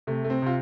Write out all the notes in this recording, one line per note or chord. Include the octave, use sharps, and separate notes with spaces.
C3 A3
A3
C4
C3 F4